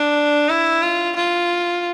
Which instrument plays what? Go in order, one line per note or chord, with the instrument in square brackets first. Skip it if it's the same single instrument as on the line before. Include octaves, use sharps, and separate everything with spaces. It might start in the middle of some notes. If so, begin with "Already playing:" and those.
Already playing: [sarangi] D4
E4
F4
F4